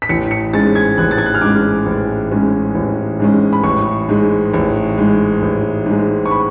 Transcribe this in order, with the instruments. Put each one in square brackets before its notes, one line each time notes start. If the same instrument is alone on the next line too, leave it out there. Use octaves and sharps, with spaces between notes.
[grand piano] B6
A1 C#7
C#7
G#2 G#3 C#4 A6
G#6
A1 F#6
A6
G#6
F#6
F6
G#2 G#3 C#4 D6
A1
G#2 G#3 C#4
A1
G#2 G#3 C#4
B5
A1 C#6
G#2 G#3
A1
G#2 G#3
A1
G#2 G#3
C#6
B5